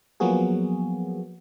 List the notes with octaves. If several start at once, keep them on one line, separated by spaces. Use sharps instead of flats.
F3 F#3 A#3 B3 F#4 G#4